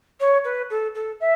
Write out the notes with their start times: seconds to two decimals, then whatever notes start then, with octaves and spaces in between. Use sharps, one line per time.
0.20 C#5
0.44 B4
0.70 A4
0.94 A4
1.20 E5